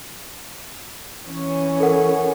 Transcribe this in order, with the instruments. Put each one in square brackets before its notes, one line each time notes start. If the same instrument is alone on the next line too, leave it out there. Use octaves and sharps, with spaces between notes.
[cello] E3 C#4
[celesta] A4 A#4 F#5